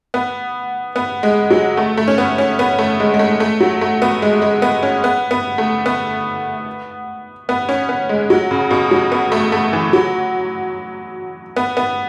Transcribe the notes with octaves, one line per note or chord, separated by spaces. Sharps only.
B3
B3
G#3
F#3
A3
A3
C#4
B3
C#4
B3
A3
G#3
G#3
A3
A3
F#3
A3
B3
G#3
G#3
B3
C#4
B3
B3
A3
B3
B3
C#4
B3
G#3
F#3
C#3
B2
F#3
B3
A3
A3
E3
F#3
B3
B3